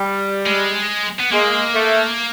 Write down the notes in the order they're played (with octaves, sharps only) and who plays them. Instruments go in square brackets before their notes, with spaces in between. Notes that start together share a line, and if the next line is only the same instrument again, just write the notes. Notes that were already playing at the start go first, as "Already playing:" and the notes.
Already playing: [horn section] G3
[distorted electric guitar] G#3
B3
[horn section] G#3 [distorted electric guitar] A#3
[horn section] A3